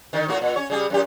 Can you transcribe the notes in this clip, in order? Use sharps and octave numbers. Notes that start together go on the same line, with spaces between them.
D3 D#3
A2 A#3 F#4
A#2
C#4 C#5
C#3 G3 G#4
F#2 A#2 G4